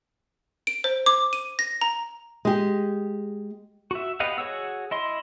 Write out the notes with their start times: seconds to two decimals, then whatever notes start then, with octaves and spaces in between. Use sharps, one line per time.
0.67 D7
0.84 C5
1.06 D6
1.33 D#7
1.59 A#6
1.81 A#5
2.45 G#3 G4
3.91 F#4 E5
4.20 B3 G4 D#5 F5 F#5
4.38 F#4 G#4 C#5 F#5 E6
4.91 E4 D#5 C6